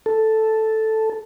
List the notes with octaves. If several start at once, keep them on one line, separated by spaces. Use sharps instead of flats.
A4